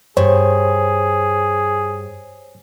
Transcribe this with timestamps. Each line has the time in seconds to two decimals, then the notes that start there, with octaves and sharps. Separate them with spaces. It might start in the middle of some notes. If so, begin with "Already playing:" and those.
0.17 G2 G#4 C5 C#5